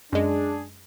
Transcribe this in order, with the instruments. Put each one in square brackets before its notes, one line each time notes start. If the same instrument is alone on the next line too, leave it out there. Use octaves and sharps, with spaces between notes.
[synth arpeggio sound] F#2 G#3 [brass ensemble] D4 G#4